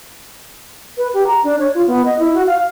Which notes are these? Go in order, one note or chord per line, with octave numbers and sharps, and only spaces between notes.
B4
G4
A#5
D4
C#5
F4
B3
D#5
E4
F#4
F5